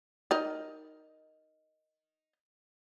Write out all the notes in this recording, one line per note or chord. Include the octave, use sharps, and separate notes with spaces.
D#4 A#4 D#5